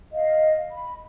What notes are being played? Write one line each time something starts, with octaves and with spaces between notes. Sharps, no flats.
D#5 F5
B5